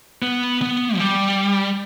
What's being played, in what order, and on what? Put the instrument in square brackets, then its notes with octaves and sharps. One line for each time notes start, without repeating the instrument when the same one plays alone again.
[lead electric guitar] B3
B3
F3
G3